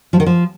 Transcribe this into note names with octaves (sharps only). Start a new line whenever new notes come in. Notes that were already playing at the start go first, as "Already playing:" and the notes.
F3
D#3
F3